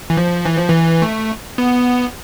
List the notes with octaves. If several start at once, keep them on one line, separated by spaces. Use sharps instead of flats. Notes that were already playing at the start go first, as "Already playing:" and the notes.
E3
F3
E3
F3
E3
A3
B3